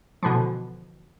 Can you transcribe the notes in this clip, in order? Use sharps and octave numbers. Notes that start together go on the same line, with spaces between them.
B2 D3 E3 F3